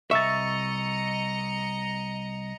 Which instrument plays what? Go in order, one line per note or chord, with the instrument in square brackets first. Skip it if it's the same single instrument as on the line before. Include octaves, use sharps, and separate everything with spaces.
[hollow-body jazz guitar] C2 E5 [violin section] D#5 A#5 C#7 [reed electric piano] C#6 E6 A6